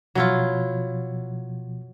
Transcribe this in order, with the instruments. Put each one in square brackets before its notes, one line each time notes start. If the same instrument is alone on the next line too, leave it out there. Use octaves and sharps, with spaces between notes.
[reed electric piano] B2 F3 [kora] F#3 E4 F4